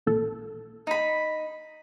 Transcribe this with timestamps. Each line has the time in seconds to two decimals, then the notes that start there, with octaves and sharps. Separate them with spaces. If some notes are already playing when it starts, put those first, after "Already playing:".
0.06 A1 A#2 A4
0.87 D#4 B5